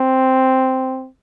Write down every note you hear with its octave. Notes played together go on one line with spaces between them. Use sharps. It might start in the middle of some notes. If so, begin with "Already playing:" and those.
Already playing: C4